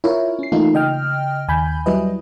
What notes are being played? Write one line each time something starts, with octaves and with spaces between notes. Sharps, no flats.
E4 F4 A#4 C#5
C#4 C7
E3 A3 A#3 D#4 F4 A4
C#3 D#5 G5 F6
D#2 G#5 B5 G6
F#3 G3 E4 B4 D#5